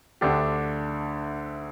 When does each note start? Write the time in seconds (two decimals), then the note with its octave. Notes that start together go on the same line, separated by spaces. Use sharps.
0.21 D2 D3 A3 D4 G4